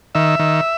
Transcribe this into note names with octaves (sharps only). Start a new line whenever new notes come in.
D#3 E5
D#3